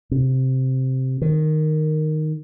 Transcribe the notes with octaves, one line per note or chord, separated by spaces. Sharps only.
C3
D#3